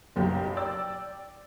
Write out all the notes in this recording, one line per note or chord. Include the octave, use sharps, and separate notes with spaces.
F#1 B1 F#2 G4
D5 G5 E6 A6